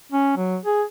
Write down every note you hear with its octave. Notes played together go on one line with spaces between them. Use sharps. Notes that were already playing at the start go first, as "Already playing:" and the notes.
C#4
F#3
G#4